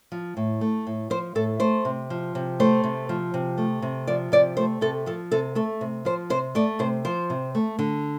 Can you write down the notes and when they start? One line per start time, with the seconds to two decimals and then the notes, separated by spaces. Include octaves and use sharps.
0.12 F3
0.37 A2
0.61 A3
0.87 A2
1.10 F3 C5
1.35 A2 A4
1.60 A3 C5
1.85 C3
2.10 F3
2.35 C3
2.60 A3 C5
2.84 C3
3.09 F3
3.34 C3
3.58 A3
3.82 C3
4.07 F3 D5
4.32 C3 D5
4.57 A3 C5
4.81 C3 A4
5.06 F3 A4
5.32 C3 A4
5.55 A3 A4
5.81 C3
6.05 F3 C5
6.30 C3 C5
6.55 A3 D5
6.79 C3 C5
7.05 F3 C5
7.30 C3
7.55 A3
7.79 D3